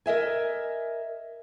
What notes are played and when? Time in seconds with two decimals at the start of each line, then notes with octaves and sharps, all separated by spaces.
0.06 A#4 D#5 E5 G#5